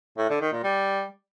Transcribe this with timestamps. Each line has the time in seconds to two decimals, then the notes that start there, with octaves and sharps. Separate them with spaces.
0.18 A2
0.29 D3
0.41 D#3
0.52 A#2
0.64 G3